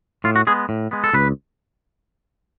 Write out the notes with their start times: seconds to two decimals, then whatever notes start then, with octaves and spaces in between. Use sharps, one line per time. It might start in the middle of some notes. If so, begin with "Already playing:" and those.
0.24 A2 F4
0.36 F#4
0.47 G#3 B3 G#4
0.69 A2
0.91 G#3 B3
1.04 A4
1.14 C#2 B4